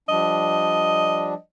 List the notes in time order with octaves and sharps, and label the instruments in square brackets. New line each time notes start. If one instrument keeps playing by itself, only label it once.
[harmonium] F3 G3 D4 [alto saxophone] D#5